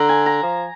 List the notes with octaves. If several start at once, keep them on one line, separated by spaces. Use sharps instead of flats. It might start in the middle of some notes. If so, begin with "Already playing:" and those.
Already playing: D3 A#5
G#5
A#5
F3